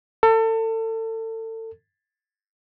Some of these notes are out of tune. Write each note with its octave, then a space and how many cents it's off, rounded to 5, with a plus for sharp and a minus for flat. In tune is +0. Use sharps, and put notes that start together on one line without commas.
A4 +30